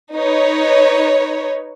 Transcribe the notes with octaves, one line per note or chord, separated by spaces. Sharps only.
D#4 B4 C#5